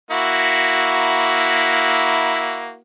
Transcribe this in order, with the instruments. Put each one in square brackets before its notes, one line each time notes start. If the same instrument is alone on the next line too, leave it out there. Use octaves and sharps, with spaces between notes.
[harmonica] A#3 E4 F#4